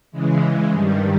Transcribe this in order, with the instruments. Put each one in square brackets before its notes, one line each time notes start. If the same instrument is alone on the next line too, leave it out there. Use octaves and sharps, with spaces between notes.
[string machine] C#3 E3 G#3
G2 D#3 G3